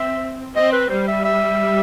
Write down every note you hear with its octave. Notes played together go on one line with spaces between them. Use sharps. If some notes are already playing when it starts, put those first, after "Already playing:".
Already playing: C4 E5
C4 D#5
B4
G3 C5
E5
E5